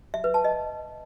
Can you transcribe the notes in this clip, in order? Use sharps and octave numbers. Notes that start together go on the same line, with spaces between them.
E5
B4
A5
D#5